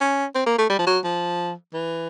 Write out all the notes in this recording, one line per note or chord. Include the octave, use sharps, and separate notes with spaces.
C#4
C4
A#3
A3
G3
F3
F#3
F3
E3